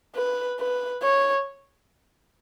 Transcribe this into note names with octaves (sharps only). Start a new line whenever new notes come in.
B4
B4
C#5